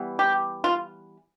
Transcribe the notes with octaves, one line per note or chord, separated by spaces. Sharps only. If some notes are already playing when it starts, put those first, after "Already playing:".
Already playing: E3 G3 B3
G4
F4